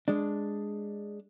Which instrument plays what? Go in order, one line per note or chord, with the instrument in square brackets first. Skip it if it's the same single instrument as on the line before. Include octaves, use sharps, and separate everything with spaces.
[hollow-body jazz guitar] G#3 D4